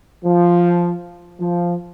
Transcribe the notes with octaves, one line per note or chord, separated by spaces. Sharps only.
F3
F3